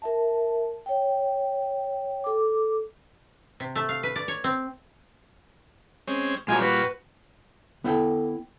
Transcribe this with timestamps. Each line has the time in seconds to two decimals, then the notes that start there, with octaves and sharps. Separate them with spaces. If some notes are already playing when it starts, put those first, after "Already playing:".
0.02 A#4 E5 A5
0.86 C#5 G5
2.24 A4 D6
3.60 C3
3.76 A3
3.89 F5
4.03 B4
4.16 D5
4.28 C#5
4.44 C4
6.07 G#3 C4 C#4
6.48 A#2 G3 G#3 F4 F#4 G#5
6.62 F#4 B4
7.84 D3 B3 E4 G5